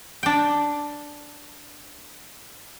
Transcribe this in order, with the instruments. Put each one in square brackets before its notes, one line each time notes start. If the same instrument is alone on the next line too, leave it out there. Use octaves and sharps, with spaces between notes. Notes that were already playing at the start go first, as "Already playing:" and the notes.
[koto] D4 G5